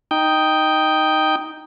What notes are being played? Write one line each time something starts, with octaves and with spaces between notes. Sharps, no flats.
D#4 G5